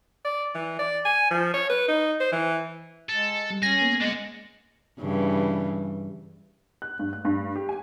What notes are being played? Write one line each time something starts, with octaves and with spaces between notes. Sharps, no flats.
D5
E3
D5
G#5
F3
C#5
B4
D#4
C5
E3
G#3 A4
G3
C#4 G#4 A#6
A#3 B3
G#3 D4 F#5
G2 C#3 E3
F#6
G2
F#6
G2
G4
G#5